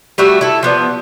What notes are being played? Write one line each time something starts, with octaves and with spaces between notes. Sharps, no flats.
G3 A3 F#4 E5
E4 A4
F3 B3 D5